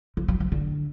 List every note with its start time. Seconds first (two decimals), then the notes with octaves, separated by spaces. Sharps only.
0.17 F3
0.28 F#3
0.40 F3
0.52 D3